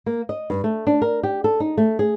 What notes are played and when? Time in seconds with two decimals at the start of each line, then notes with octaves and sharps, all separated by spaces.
0.06 A#3
0.29 D#5
0.50 G2
0.64 A3
0.87 D4
1.02 A#4
1.23 G4
1.44 A4
1.60 D#4
1.78 A3
1.99 G#4